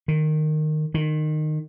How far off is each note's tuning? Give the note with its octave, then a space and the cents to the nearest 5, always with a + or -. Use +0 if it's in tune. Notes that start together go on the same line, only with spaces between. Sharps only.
D#3 -15
D#3 -20